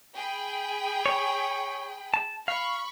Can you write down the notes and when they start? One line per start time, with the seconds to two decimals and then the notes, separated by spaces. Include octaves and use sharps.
0.16 G#4 G5 B5
1.06 C#5
2.14 A5
2.48 F5 B5 C#6